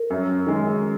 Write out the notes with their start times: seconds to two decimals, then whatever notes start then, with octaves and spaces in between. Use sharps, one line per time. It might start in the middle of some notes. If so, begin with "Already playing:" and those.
Already playing: A#4
0.10 F#2
0.47 D#3 G#3